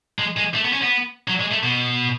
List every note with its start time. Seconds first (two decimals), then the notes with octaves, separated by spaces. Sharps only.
0.19 G#3
0.37 G#3
0.54 A3
0.64 B3
0.73 C#4
0.82 B3
1.28 F#3
1.40 G#3
1.51 A3
1.63 B2